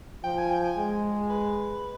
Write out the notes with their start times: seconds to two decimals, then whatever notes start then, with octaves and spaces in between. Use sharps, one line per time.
0.24 F3 G5
0.38 G#5
0.51 G5
0.64 G#5
0.78 G#3
1.30 B4